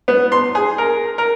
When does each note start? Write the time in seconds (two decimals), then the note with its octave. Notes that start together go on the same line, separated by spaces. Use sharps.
0.08 B3
0.32 C6
0.55 G#4
0.78 A#4
1.18 A#4